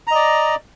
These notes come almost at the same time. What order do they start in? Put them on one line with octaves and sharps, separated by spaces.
A#5 D#5 D5